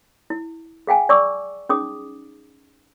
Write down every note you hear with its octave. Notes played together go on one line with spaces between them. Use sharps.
E4
G#4 F5 G5 G#5
D5 C#6 D6 E6
C#4 D#4 G#4 D6 D#6